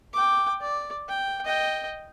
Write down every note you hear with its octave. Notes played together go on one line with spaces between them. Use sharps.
G5 D6
D5
G5
D#5 G5